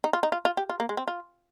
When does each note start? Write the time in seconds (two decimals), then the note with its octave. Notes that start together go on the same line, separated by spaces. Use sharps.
0.04 D#4
0.13 F4
0.23 D#4
0.32 F4
0.45 F4
0.57 G4
0.69 F4
0.80 A#3
0.89 G#3
0.97 C4
1.08 F4